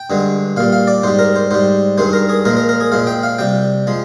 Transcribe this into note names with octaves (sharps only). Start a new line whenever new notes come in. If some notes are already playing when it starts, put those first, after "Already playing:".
Already playing: G5
G2 D3 G#3
A#2 G3 F5
F5
D5
G#2 G3 C5
A#4
C5
G#2 G3 C5
G2 D#3 G#3 C5
A#4
G#4
A#2 F3 G#3 A#4
A#4
A#4
G#4
A#2 F3 G#3 F5
G5
F5
C3 G3 G5
F3 G#3